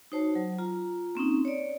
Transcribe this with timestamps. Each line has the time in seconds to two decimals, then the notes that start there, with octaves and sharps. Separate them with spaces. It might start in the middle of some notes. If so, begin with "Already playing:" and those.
0.12 D#4 F#4 C5 C#5 A5
0.35 F#3
0.58 F4 A#5
1.15 A#3 C4 C#4 D#4
1.45 C#5 D5